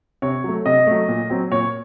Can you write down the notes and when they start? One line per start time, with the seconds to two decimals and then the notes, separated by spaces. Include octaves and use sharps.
0.22 C3 C#5
0.44 F#3 A3
0.66 C3 D#5
0.87 F#3 A3
1.08 A#2
1.30 F#3 C4
1.51 A#2 C#5